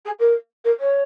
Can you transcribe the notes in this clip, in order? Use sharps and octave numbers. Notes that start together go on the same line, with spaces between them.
G#4
A#4
A#4
C#5